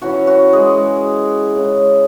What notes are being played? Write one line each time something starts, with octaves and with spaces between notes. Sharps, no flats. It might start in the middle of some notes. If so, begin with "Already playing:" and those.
E3 C#4 E4 F#4
F#4
G#3 G#4
C#3 G#3 C#4 E4